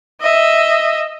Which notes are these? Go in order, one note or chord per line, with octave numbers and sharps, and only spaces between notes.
D#5 E5